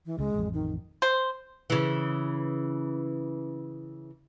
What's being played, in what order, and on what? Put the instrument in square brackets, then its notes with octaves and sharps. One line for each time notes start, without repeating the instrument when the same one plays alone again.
[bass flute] E3
[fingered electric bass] C#2 C#3 [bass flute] G#3
[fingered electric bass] A1 F2
[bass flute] D#3
[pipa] C5
[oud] C#3 E3